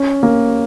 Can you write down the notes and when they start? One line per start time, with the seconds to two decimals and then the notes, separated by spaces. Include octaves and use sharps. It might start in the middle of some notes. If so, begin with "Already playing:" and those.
Already playing: C#4
0.23 A#3